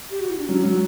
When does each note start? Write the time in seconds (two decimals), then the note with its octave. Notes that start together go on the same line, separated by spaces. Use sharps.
0.11 G4
0.20 F#4
0.30 E4
0.39 D4
0.48 F#3 C#4
0.64 F#3